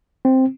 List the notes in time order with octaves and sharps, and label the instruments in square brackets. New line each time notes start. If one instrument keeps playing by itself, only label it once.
[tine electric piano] C4